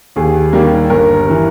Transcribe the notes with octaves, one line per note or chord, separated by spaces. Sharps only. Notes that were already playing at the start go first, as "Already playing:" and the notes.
D#2 G#4
D#3 G3 A#3
G1 A#4
E3